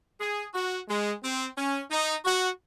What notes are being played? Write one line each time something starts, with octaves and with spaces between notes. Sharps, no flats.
G#4
F#4
G#3
C4
C#4
D#4
F#4